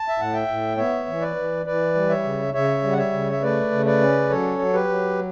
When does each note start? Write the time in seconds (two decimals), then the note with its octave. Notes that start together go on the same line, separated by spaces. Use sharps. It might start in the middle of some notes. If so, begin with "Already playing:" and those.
Already playing: A5
0.08 E5
0.18 A2 F#5
0.33 E5 G5
0.48 A2
0.77 B3 C#5 E5
1.06 E3
1.21 B4 D5
1.36 E3
1.66 E3 B4 D5
1.95 G3
2.09 C#5 E5
2.24 C#3
2.53 C#3 C#5 E5
2.83 G3
2.92 F#5
2.98 C#5 E5
3.12 C#3
3.32 E5
3.41 A3 B4 D5
3.71 C#3
3.85 B4 D5
4.01 C#4
4.30 F#3 A4 C#5
4.59 F#3
4.73 G4 B4
4.88 F#3